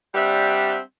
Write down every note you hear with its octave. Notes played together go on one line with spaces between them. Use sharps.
G3 C4 D4 E5 F#5